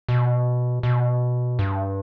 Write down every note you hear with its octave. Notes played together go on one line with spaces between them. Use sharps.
B2
B2
G2